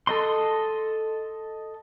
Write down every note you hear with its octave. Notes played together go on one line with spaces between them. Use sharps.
A4 D#5 C6